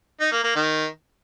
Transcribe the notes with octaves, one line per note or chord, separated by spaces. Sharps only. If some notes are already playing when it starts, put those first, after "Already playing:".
D#4
A#3
A#3
D#3